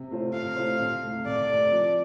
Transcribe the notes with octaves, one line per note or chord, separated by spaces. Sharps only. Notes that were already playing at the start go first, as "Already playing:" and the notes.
Already playing: C3
A3 F4 C5
C3 F5
A3 F4 C5
C2
C3 A3
C2 D5
C3 A3
F3